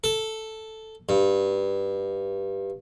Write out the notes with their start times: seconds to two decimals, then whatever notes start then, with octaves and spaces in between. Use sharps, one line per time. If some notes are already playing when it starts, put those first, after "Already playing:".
0.04 A4
1.09 G2